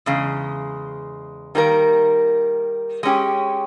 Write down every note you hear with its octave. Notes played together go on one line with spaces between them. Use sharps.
E2 C#3 G#3
D#3 G3 A#3 D#4 A#4
G#3 C#4 G4